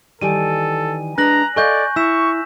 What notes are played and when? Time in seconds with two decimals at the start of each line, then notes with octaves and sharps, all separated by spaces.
0.21 D#3 E3 G3 A4 G#5 D#7
1.18 G#3 D4 B4 A#5 F#6 A#6 F#7
1.56 A4 D5 D#5 F5 G#5 C#6 G6
1.96 E4 C#6 E6 B6 E7